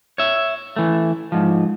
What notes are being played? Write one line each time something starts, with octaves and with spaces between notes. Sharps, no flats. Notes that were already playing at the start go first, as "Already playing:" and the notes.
C#5 E5
E3 A3
G#2 F3